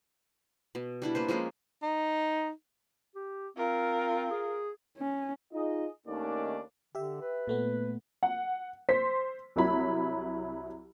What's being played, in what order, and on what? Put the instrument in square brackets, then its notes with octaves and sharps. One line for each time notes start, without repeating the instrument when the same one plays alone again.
[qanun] B2
G3 D4 E4
A#3 B4 C5
F3 G#3 A#3 C#4
[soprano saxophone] D#4
[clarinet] G4
[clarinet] C4 [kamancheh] F4 A#4
[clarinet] G#4
[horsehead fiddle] C#4
[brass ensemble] D#4 F4 G#4 D#5
D#2 D#3 A3 C#4 D4 D5
[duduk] D3 [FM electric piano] G4 E5
[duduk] B4
[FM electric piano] A#2 A3 B3
[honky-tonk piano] F#5
C5 C6 B6
C2 F#3 E4 B5